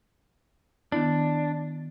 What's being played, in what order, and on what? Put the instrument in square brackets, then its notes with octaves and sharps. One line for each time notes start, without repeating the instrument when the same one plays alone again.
[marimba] D#3 B3 E4 [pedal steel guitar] D4